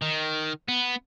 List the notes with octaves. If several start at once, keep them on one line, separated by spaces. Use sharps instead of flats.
D#3
B3